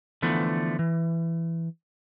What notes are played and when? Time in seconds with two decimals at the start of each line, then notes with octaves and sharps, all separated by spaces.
0.22 D3 E3 F3 A3 B3
0.79 E3